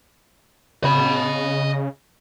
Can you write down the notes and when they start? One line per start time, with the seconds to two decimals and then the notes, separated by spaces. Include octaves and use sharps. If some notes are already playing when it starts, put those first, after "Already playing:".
0.84 C#3 D#5 B5